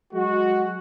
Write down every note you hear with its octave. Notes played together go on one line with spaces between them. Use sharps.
F#3 G#3 F#4